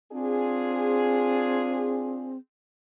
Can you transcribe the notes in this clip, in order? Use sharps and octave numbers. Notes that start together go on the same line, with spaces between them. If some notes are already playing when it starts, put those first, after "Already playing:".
C4 D4 F4 G#4